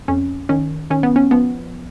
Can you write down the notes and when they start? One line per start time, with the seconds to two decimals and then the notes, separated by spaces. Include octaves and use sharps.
0.08 F2 C#4
0.49 D#3 C#4
0.90 D#3 C#4
1.03 B3
1.16 C#4
1.31 F3 B3